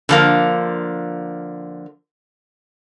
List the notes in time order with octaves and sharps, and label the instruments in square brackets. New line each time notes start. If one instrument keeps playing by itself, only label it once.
[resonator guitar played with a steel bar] D3 F3 A#3